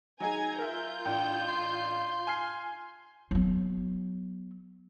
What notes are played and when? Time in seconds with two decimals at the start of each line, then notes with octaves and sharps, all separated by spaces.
0.20 F#3 D#4 G#4 G#5 A#5 G#6
0.58 F4 A#4 E5 G6
1.05 A1 D4 G5
1.48 C6
2.27 G#5 F6 C7
3.31 F#3 B3